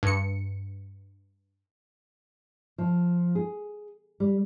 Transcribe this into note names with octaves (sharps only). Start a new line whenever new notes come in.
G2 C#7
F3
G#4
G3